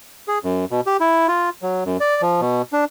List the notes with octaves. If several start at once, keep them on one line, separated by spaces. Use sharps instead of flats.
G#4
F#2
B2
G4
E4
F4
F#3
F#2
D5
F3
B2
D4